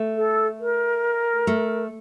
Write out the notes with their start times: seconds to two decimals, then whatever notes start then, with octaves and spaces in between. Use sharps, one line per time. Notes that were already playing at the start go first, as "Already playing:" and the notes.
Already playing: A3
0.16 A4
0.59 A#4
1.47 A3